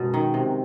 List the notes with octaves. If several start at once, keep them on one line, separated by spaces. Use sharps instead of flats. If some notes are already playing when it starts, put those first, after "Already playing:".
Already playing: F#2 B2 G#3
D#3
C3